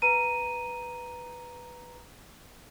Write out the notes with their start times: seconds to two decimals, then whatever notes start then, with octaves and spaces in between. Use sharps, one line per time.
0.02 B4 A#5 D#7